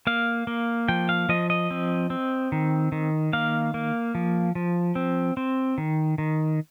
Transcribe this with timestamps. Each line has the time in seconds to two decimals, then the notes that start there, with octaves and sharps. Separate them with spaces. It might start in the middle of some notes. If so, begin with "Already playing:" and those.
0.07 A#3 F5
0.47 A#3
0.88 F3 G5
1.09 F5
1.29 F3 D#5
1.50 D#5
1.71 C4
2.10 C4
2.52 D#3
2.92 D#3
3.33 A#3 F5
3.74 A#3
4.15 F3
4.55 F3
4.95 C4
5.37 C4
5.78 D#3
6.18 D#3